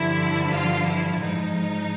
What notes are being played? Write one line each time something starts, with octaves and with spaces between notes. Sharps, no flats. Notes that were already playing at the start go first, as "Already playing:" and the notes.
Already playing: G2 D3 F3 E4
F4
E4
G#2 F3 D#4